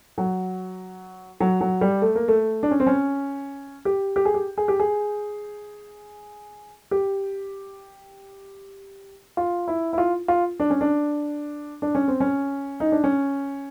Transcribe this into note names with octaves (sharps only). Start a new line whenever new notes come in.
F#3
F#3
F#3
G3
A3
A#3
A3
D4
C#4
C4
C#4
G4
G4
G#4
G4
G#4
G4
G#4
G4
F4
E4
E4
F4
F4
D4
C#4
D4
D4
C#4
C4
C#4
D#4
D4
C#4